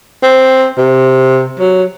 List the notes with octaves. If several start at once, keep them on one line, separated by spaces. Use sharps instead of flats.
C4
C3
F#3